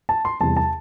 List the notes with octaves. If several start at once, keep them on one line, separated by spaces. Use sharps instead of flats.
A5
C6
E2 C3 G3 A5
A5